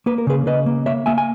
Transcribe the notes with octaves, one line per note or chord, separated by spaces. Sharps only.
A#3 B4
A#4
C#3 G#4 B4
C#3 B4 D#5
A#3
A#3 C#5 E5
A#3 E5 G#5
G#5